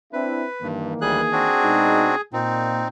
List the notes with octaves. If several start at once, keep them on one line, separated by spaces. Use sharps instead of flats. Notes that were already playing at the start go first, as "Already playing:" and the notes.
C4 D4 E4 B4
G2 D#3 E3 A#3
D2 G3 G#4 F#6
C4 D4 F#4
B2 G#3 D#4
A#2 C4 D#4